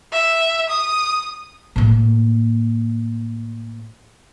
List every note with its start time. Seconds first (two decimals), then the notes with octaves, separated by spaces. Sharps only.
0.12 E5
0.70 D#6
1.76 A2 A#3